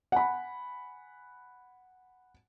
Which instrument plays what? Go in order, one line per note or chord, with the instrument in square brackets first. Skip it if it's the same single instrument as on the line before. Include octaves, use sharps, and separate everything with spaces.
[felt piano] F#5 G#5 B5